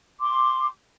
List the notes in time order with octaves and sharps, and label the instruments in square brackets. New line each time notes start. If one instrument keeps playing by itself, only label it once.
[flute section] C6 D6